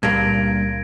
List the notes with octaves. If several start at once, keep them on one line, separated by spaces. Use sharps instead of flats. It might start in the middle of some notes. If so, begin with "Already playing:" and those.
C#2 G2 A#2 A#3 G#6 A#6 D7